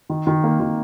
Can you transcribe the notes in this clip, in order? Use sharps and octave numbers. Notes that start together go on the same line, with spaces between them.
D#3
D#3
A#3
D#3